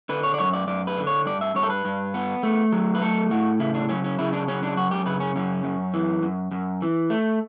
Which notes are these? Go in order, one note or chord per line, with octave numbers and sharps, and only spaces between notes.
D3 B4
C#5
D5
F#2 C#5
D5
F#2 D5
B4
D3
C#5
G2 D5
E5
G2 C#5
A4
B4
G2
B3
A3
F#3
B4
A3 A4
A2 F#4
C#3 E4
D4
F#3 C#4
C#4
C#3 E4
D4
F#3 C#4
D4
F#2 F#4
G4
C#3 B4
C#4
F#2 C#4
F#2
E3
F#2
F#2
E3
A3